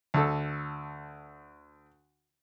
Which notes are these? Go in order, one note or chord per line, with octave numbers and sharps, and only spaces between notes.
D2 A4